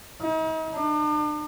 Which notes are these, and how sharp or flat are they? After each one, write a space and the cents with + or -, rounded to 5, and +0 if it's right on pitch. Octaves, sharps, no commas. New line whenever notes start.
D#4 +40
D4 +40